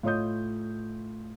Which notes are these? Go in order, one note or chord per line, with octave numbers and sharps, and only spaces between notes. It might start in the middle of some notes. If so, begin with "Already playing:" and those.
A2 F4 C#5 D#5 D#6 G6